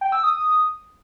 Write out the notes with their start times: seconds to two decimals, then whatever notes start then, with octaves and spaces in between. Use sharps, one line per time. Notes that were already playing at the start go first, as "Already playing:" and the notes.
0.01 G5
0.12 E6
0.23 D#6